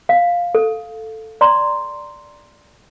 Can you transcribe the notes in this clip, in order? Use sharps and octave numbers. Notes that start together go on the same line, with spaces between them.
F5
A4
D5 A#5 C6